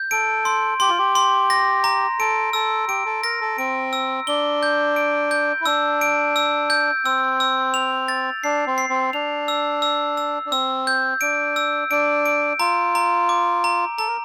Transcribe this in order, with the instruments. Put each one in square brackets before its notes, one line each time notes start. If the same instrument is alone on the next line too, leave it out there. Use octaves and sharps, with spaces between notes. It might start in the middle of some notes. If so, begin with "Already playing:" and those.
Already playing: [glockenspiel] G6
[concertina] A4 [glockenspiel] D7
[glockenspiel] C6
[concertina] G4 [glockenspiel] C6
[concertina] F4
G4
[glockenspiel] C6
A#6
A#5
[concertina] A4 [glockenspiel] D7
[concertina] A4 [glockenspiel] E6
[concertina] G4 [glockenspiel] D7
[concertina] A4
[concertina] A#4 [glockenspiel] A#6
[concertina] A4
[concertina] C4 [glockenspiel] D7
[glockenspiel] E6
[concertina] D4 [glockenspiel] G7
[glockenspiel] G6
D7
G6
[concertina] E4
[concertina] D4 [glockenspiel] E6
[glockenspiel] D7
E6
G6
[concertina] C4 [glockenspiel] E6
[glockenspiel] E6
F7
A6
[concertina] D4 [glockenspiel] C7
[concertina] C4
[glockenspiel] C7
[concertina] C4
[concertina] D4 [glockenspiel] F7
[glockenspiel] E6
E6
E6
[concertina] D4
[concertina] C4 [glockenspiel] E6
[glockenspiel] G6
[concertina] D4 [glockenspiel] D7
[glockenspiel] E6
[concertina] D4 [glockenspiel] D7
[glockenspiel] D7
[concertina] F4 [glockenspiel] A#5
[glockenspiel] A#5
D6
A#5
[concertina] A4 [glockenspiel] A#5
[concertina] A#4